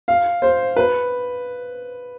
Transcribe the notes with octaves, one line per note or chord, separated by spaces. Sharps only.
F5
C5
B4